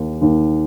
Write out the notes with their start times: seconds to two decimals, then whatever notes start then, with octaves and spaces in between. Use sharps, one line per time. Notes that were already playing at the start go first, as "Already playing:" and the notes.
Already playing: D#2 D#3
0.21 D#2